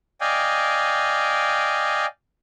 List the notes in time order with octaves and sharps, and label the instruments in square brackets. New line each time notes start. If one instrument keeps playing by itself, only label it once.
[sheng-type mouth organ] D5 D#5 F5 G5 G#5